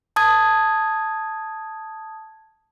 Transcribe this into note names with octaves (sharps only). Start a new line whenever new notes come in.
A5 D#6 G#6